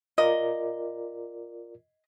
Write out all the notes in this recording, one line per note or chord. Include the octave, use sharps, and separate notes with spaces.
F4 A#4 D5 D#5